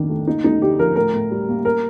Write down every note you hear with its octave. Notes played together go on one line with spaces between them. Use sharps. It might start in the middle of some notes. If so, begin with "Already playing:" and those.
Already playing: F2 D#3 A#3 D4
A3
A#3 D#4
D2 D#4
D3 G4
F3 A#4
A2 A#4
A2
G3
A#3
A#4